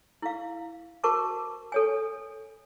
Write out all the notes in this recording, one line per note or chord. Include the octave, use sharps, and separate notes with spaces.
E4 F5
F#4 A#4 C5 A5 C#6 D6
A4 C#5 G#5